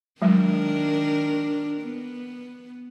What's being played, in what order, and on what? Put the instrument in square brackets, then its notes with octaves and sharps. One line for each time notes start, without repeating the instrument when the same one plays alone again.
[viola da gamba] D#3 D4 A#4 [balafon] F#3 G#3
[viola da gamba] B3